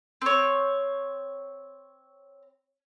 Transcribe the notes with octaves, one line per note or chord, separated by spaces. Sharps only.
C4 C#5